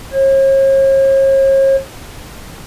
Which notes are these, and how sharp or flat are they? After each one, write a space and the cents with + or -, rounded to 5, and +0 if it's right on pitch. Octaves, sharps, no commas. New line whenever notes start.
C#5 -45